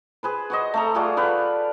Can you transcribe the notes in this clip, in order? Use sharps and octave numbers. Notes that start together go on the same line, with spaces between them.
G#4 B4 C5
F#4 C5 D#5
A3 A4 A#5
F4 F#4 G#4 D5
A4 B4 F5 G5